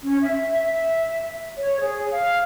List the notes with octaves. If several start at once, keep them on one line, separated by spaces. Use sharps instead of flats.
C#4
E5
E5
C#5
G#4
F5